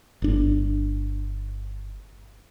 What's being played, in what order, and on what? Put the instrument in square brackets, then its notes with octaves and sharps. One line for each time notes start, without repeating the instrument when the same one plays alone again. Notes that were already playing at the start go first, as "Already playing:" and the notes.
[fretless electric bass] G1 D4